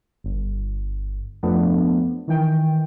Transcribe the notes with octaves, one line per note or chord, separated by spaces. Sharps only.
G1
F2 F3 A3 B3 D4
D#3 E3 G5